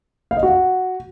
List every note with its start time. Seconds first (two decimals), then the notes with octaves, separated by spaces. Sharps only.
0.31 F5
0.37 D#5
0.43 F#4